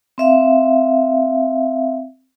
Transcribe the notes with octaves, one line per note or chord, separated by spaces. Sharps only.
C4 E5 F5